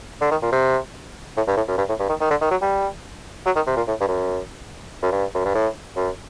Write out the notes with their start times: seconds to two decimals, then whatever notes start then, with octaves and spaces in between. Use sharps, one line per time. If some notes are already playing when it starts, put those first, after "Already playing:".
0.21 D3
0.31 D#3
0.42 A#2
0.52 C3
1.37 A2
1.47 G2
1.57 A2
1.68 F#2
1.78 G2
1.89 A2
1.99 G2
2.09 D#3
2.21 D#3
2.31 D3
2.41 D#3
2.51 F#3
2.62 G3
3.46 F#3
3.56 D#3
3.67 C3
3.77 A#2
3.88 A2
4.01 G2
4.08 F#2
5.02 F#2
5.12 G2
5.35 F#2
5.45 G2
5.55 A2
5.97 F#2